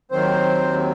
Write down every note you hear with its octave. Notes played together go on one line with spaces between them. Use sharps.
D#2 D#3 F#3 C4 C5